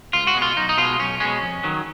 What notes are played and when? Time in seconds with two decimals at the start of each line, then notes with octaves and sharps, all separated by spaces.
0.13 C#2 F4
0.27 F#4
0.34 B2 G#3
0.42 F4
0.57 B1 D#4
0.69 D#4
0.77 B2 G#3 F4
0.99 B1 C#4
1.20 B2 G#3 C#4
1.42 F2
1.64 D#3 F#3